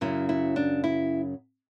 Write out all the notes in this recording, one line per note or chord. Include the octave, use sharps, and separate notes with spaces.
F#2 C#3 F#3 C#4 E4
E4
D4
E4